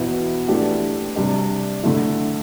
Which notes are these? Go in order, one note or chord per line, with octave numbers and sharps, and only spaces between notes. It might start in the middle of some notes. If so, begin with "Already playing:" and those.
Already playing: E2 B2 B3 E4
E3 A3 D4 G4
C3 G3 D4 G4 D5
D3 A3 E4